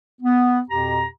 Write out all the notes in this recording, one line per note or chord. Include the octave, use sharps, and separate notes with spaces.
B3
F2 B2 G4 A#5